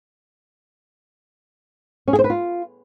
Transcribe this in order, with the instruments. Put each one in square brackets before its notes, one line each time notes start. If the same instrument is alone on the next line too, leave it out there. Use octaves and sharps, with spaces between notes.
[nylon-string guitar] C#4
G#4
C5
B4
F4